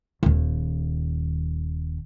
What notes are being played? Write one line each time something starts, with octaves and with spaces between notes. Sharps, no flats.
D#1 D#2